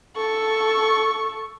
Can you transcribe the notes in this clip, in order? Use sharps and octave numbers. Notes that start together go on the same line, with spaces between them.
A4 C#6